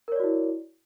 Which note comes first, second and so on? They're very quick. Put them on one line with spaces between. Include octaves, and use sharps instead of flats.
A#4 C#5 D5 F#4 E4